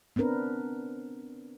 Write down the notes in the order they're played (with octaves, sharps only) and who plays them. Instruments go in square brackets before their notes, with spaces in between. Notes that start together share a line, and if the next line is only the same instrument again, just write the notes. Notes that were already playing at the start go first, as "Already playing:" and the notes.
[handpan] B3 C4 D4 A#4 B4